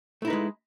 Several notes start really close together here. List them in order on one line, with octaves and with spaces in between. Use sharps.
A3 E4 D#4 B4 G#3